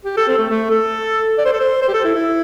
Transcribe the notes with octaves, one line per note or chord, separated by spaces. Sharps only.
G4
A4
C4
A3
A3
A4
D5
C5
A4
C5
C5
G4
A4
E4
E4